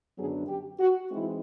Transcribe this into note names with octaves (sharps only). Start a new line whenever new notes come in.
F#2 D3 F#3 B3 D4 G#4
G4
F#4
E3 G#3 C4 D#4 E4